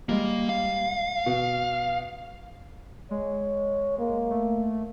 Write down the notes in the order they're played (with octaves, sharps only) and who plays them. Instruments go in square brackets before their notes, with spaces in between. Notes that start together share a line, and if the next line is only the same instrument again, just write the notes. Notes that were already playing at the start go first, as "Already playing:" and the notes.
[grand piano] G3 G#3 [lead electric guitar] A#3
[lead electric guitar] F5
[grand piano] B2
[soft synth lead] G#3 [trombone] C#5
[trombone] A#3
[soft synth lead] A3